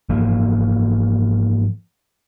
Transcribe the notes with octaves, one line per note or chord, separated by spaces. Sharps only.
G#2 E3 F3 A#3